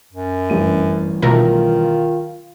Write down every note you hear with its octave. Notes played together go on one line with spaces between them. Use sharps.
F#2
A1 G2 D#7
B1 D#3 A3 F4 A#4